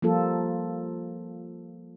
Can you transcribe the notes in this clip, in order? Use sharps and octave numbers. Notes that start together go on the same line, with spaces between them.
F3 G3 A#3 F4 A4